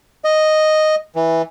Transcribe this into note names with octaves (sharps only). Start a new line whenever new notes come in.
D#5
E3